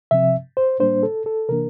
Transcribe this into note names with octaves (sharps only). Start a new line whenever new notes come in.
C3 F3 C4 E5
C5
A2 G3 A#3 D4 C5
A4
A4
C3 E3 A#3 D4 A#4